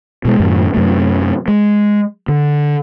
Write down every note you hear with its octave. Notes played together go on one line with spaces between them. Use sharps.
B2 G#3
F#2 A2 D#3
F#2 C3 A3
G#3
D3